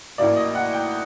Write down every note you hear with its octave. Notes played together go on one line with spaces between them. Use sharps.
A1 A2 F#3 A#3 D5
D#5
F#5
G5